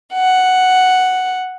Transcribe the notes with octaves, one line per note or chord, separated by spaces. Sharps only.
F#5